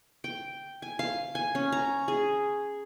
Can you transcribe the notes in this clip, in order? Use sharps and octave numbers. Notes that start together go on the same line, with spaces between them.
G5
G#5
F5
G#5
C#4
A#5
G#4